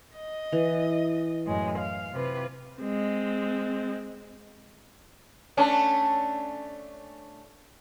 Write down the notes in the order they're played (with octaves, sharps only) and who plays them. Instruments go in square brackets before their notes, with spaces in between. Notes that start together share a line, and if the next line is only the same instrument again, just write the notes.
[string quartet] D#5
[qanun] E3
[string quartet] F#2 A2 G#3
F5
C3 F4 B4
[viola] G#3 C4
[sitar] A3 C#4 D4